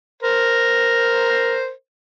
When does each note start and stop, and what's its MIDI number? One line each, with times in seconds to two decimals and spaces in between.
0.23 1.71 70
0.23 1.71 72